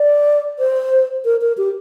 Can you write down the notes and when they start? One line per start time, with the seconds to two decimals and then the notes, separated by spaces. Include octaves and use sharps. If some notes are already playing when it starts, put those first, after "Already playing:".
Already playing: D5
0.59 C5
1.25 A#4
1.41 A#4
1.58 G4